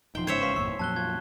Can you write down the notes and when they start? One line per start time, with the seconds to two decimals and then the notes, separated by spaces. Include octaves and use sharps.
0.15 D#1 F3 D#4 G5 C6
0.27 G1 G#2 C#3 C5 C#5 E5 G#6
0.41 B4 F5 G5 C6 C#6 B6
0.56 G1 E2 A#2 C#6 E6 C7
0.79 F2 A#2 F#3 A5 F#6 G7
0.96 F4 G#6